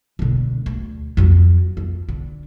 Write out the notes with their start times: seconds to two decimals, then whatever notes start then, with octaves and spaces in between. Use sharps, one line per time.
0.19 E1 D3
0.66 D2
1.17 F2 F#3
1.77 F2
2.09 D3